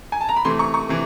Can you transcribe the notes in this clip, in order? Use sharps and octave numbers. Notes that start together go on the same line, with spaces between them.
G#5
A5
A#5
B5
C3 E3 A3 C6
C#6
C#6
C3 E3